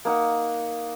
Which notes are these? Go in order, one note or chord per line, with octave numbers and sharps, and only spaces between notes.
A#3 D#4 F#5